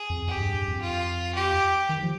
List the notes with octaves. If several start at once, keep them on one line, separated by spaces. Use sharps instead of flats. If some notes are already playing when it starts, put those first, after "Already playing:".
Already playing: G#4
F2
F2 G4
G2
G2
F2
F4
G4
D#3
F3